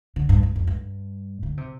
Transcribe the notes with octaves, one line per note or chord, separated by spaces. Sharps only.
D3
G2
G2
F2
G2
D3
C3